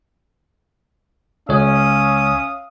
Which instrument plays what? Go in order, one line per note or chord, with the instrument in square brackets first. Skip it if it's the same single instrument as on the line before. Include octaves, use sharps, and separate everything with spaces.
[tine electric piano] C#2 C#5 [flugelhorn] C#4 [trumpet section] E5 F5 D#6